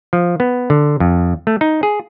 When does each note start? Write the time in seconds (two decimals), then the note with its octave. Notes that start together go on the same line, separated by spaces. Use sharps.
0.13 F3
0.40 B3
0.70 D3
1.00 F2
1.47 A3
1.61 D#4
1.83 G#4